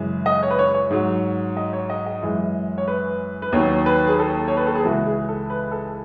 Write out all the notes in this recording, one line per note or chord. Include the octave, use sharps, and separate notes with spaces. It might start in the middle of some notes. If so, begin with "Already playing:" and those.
Already playing: F#2 C#3 E3 G#3
D#5
C#5
B4
C#5
C#5
G#2 F#3
D#5
C#5
D#5
D#5
F#2 E3 G#3
C#5
B4
B4
D#2 D#3 F#3 C#5
B4
G#4
A4
C#5
B4
A4
G#4
C#2 C#3 E3 G#3 F#4
G#4
A4
B4
A4